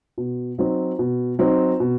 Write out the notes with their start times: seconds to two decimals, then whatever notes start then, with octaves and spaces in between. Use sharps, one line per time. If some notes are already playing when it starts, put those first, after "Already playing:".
0.18 B2
0.58 F#3 C4 D#4
0.99 B2
1.39 F#3 C4 D#4
1.80 B2